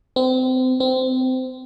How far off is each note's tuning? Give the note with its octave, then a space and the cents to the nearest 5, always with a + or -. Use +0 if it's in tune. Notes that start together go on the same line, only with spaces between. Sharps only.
C4 -30
C4 -20